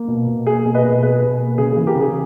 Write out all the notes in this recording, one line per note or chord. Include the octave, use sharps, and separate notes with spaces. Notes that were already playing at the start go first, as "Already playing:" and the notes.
Already playing: A#3
B2
B2
A#3 G#4
B2
B4 D#5
B2
B2 G#4 B4
B2
A#3
C#3 G#4
G#4
E3
G4 A#4
C#3 G#4